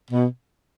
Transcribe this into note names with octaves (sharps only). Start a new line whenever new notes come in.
B2